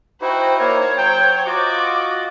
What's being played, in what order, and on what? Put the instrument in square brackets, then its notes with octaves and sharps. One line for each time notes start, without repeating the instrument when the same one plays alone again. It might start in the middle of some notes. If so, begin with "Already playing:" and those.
[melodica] D#4 E4 [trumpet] F#4 [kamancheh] C5 G5
[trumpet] A#3 [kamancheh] C5 C#5
[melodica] F#3 [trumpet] G5
[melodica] F4 D#5 [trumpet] F#4 [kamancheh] D6